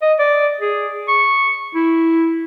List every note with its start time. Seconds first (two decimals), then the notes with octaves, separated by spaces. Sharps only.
0.02 D#5
0.19 D5
0.61 G#4
1.09 C#6
1.75 E4